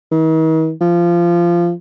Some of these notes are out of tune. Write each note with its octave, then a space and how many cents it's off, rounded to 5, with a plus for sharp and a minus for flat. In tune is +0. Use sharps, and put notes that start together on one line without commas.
D#3 +45
F3 -20